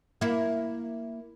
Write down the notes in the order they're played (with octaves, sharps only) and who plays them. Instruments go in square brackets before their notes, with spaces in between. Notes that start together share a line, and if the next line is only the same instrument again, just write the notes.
[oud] A#3 E4